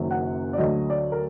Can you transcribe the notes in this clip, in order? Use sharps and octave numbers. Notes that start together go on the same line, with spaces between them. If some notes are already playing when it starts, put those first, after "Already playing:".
Already playing: F#1 F#2 D#3 F#3
F#5
D5
D2 D3 F#3 D#5
D5
A#4